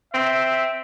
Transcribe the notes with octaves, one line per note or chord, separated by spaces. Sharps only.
C4 E5